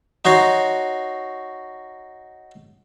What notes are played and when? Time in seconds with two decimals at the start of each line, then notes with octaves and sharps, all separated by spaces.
0.25 D#4 F#4 C#5 C6